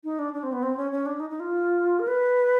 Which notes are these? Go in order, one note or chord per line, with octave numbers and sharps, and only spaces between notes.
D#4
D4
D4
C4
B3
C4
C#4
C#4
D4
D#4
D#4
F4
A#4
B4